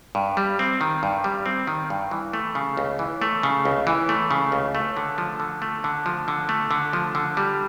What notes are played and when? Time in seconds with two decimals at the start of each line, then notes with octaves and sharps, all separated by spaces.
0.15 G2
0.37 G3
0.59 C4
0.81 D#3
1.03 G2
1.24 G3
1.46 C4
1.67 D#3
1.90 G2
2.11 E3
2.33 A3
2.55 C#3
2.77 C#2
2.99 E3
3.22 A3
3.43 C#3
3.65 C#2
3.87 E3
4.09 A3
4.31 C#3
4.52 C#2
4.75 A3
4.97 D3
5.18 F3
5.40 D3
5.62 A3
5.84 D3
6.06 F3
6.28 D3
6.49 A3
6.71 D3
6.93 F3
7.15 D3
7.37 G3